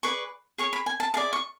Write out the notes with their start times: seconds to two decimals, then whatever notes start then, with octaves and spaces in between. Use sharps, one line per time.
0.03 G#4 B4 D5 C#6
0.58 G#4 C#5 C#6
0.73 B5
0.86 G#5
1.00 A5
1.14 E4 G#4 D5 A5
1.33 C#6